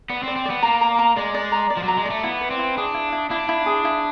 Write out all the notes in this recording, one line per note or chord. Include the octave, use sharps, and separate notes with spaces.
B3 D5
C4
D5
C4
B3 D5
A#3 A#5
A#5
A#5
G#3 D5
D5
A#5
D5
F3
F#3 A#5
G#3
A3 D5
B3 E4
B4
C4
E4
D4 G#4
E4
E4
D4 E4
E4
G#4
E4